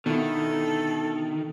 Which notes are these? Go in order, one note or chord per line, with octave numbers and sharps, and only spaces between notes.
B2 D3 D#3 E4 A4